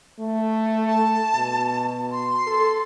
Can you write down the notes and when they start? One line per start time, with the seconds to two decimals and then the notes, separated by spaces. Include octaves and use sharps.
0.20 A3
0.88 A5
1.35 B2
2.12 C6
2.47 A4